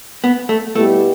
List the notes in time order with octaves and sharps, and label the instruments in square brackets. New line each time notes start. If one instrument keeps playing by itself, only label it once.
[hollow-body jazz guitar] B3
A3
[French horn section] B2 G3 B3 E4 G4 [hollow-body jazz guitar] A3